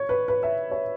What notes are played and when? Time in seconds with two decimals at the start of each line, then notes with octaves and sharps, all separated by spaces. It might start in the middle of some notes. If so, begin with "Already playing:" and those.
Already playing: C#5
0.09 B4
0.28 B4
0.43 E5
0.71 C#5